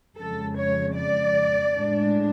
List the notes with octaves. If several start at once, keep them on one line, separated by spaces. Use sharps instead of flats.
F2 C#3 G#3 A4
C#5
D5
A2 G#3 D4